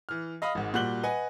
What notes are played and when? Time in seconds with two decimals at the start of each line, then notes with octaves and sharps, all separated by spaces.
0.09 E3 F6
0.42 D#5 F5 B5 D#6
0.55 G#1 G#2
0.74 A#2 G3 F#4 F#6 F#7 G7
1.03 B4 D#5 F#5 G#5